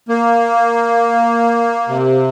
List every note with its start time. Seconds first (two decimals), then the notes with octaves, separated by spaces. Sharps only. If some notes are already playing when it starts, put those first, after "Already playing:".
0.08 A#3
1.89 C3